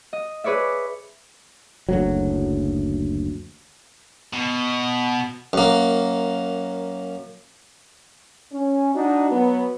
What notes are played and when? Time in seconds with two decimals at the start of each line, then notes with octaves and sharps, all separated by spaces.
0.13 D#5
0.44 G#4 B4 C#5 D5 E5
1.89 F#1 D2 F#3
4.33 B2
5.53 F#2 A#3
8.53 C#4
8.95 D4 D#4 F#4
9.31 F#3 B3